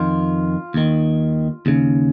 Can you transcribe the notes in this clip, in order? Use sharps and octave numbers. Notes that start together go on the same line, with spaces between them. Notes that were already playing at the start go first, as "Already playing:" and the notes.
Already playing: F2 D#3 F4
D#2 D#3
D#2 C#3